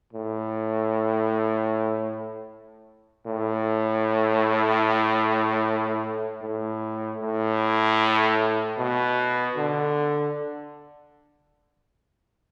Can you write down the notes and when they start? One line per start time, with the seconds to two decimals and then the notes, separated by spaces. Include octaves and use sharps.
0.13 A2
3.27 A2
6.42 A2
7.20 A2
8.78 B2
9.57 D3